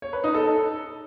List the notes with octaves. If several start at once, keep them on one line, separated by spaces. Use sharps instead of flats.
C#5
B4
D#4
A4